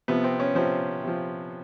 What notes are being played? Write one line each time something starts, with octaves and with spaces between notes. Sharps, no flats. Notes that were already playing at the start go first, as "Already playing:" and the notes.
C3 F3 B3
C4
C#4
C3 F3 C4
C3 F3